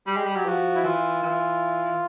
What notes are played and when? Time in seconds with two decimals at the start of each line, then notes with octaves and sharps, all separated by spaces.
0.07 G3 G4
0.16 G#3
0.26 G3
0.36 F#3
0.45 F3 F#4
0.75 E4
0.84 E3 F4
1.22 E3